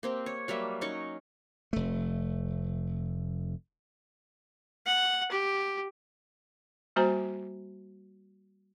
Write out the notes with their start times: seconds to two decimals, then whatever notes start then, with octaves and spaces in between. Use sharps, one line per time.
0.03 A#3 C4 G4
0.26 C#5
0.48 F#3 G3 A#3 E5
0.81 F#3 C#4 D#4 C#6
1.73 F1 A3
4.86 F#5
5.31 G4
6.96 G3 A#3 F#4 C5 G#5 A#5